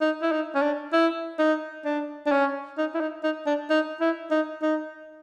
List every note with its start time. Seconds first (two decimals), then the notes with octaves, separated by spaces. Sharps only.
0.01 D#4
0.22 E4
0.32 D#4
0.55 C#4
0.62 D4
0.93 E4
1.39 D#4
1.85 D4
2.26 D4
2.32 C#4
2.78 D#4
2.94 E4
3.01 D#4
3.24 D#4
3.47 D4
3.70 D#4
4.01 E4
4.31 D#4
4.62 D#4